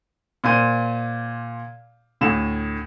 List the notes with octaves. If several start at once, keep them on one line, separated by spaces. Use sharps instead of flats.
A#2 C5 D#7
D2 A2 E7